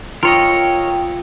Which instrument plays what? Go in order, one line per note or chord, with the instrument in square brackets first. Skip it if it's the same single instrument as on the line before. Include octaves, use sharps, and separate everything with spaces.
[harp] F4 C6 E6 [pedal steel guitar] A#4 C#5 D#5 [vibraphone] G5